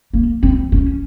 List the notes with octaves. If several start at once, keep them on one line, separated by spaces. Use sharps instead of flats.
A#3
C4
C#4